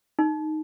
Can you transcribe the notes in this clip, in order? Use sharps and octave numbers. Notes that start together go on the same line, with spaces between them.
D#4